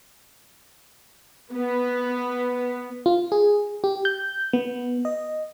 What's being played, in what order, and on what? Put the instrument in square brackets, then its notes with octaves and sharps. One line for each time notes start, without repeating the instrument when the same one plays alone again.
[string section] B3
[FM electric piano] F4
G#4
G4
G6
B3
D#5